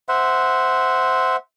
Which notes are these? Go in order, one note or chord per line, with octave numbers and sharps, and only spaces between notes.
C5 E5 F#5